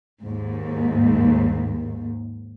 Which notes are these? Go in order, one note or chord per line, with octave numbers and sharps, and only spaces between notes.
D#2 G#2